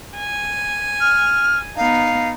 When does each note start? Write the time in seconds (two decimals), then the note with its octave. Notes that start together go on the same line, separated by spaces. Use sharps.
0.17 G#5
1.01 F6
1.77 B3 D#4 F5